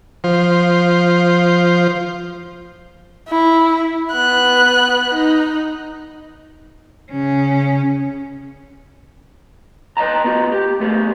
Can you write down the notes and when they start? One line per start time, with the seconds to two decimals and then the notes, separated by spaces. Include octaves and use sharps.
0.24 F3 C5
3.28 E4
4.12 B3 F#6
5.14 D#4
7.12 C#3 C#4
9.97 B4 D#5 E5 A5 A#5
10.25 B3 F4 F#4
10.52 G4
10.80 A3 B3 G#4